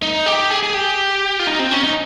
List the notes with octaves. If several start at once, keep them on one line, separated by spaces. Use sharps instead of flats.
D#4
G4
G#4
G#4
G4
F4
D#4
C4
C#4
D#4